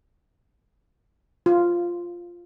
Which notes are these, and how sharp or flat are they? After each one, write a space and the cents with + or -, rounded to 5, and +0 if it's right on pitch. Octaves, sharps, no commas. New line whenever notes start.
F4 -5